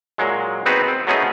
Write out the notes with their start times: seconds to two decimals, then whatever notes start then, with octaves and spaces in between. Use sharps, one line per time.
0.18 A#2 F#3 G#3
0.66 B3 C4 D#4 F#4 G#4 B4
0.88 C4
1.07 F#3 A3 B3 C#4 D#4 G#4